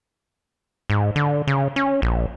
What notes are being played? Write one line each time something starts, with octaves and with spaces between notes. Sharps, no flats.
G#2
D3
C#3
C#4
A#1